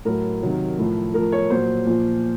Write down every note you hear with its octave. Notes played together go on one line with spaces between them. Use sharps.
A2 F#3 A#4
C3 D#3 F#3
A2 F3
A2 F3 A#4
C#5
A#2 F#3 C5
A#2 F3